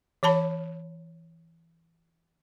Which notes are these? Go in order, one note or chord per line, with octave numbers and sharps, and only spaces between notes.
E3 C#5 A5 B5